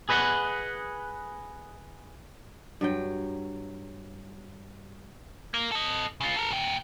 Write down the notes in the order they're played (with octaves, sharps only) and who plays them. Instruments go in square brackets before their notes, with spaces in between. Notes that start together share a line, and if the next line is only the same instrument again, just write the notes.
[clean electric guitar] G#4 B4 D#5 E5 F#5
[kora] G2 F#3 G5
[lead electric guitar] A#3
A4 D#5
C#3 F4
A4 A#4
A#2 G5